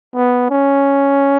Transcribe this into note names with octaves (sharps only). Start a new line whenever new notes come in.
B3
C#4